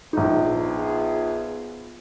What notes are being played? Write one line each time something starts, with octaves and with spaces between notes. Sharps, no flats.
A#1 B3 D#4 F4 G#4